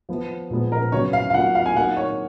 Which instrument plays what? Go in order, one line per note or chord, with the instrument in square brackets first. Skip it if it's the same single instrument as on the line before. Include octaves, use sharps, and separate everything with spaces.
[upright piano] F3 B3 F4
A#2 F3 G#3 B3
[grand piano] A#4
[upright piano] C#3 F#3 B3 [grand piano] C#5
[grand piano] F5
F5
[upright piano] F#3 A#3 F4 [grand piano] F#5
[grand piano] F5
G#5
[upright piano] F#3 A#3 D#4 [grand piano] F#5
[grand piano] C#5